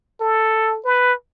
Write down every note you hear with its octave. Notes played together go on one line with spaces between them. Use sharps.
A4
B4